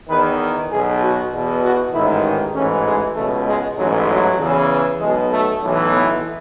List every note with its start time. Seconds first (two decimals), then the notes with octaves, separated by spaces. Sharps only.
0.09 E2 D#3 B4
0.70 B1 B2 G#4
1.01 F#4
1.32 E2 B2
1.62 F#4
1.93 A1 G#2 D#3 E4
2.24 D#4
2.54 A1 G#2 E3 C#4
2.85 G#3
3.15 C#2 B2 A3
3.46 G#3
3.77 A1 G#2 E3 F#3
4.08 F#3
4.38 E2 C#3 E3
5.00 B1 B2 G#3
5.31 A3
5.61 B1 A2 E3
5.92 B3